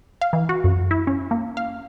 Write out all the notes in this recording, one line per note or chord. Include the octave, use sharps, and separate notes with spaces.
F5
E3
F#4
F#2
E4
C#4
A#3
F5